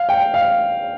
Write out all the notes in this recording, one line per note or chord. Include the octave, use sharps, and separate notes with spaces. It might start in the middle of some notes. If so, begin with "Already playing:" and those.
Already playing: F5
G5
F5